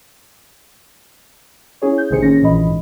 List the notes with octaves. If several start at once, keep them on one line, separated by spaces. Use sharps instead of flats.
C#4 E4 G#4 C#5
G6
A1 C3 D#3 G#4 C5 C#7
A#3 C#4 A#6
A#1 A#2 E3 D#5 B5
G#2